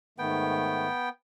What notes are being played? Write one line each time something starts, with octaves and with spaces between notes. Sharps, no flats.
G#2 D#3 A3 B3 G5